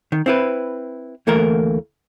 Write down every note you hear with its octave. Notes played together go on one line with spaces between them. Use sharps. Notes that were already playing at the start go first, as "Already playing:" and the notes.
D#3
C4 E4 B4
D2 E3 A3 A#3 A#4